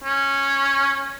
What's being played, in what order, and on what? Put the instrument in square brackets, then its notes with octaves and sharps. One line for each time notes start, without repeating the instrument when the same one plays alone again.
[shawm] C#4